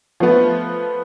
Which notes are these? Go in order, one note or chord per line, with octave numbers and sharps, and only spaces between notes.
F3 A3 B3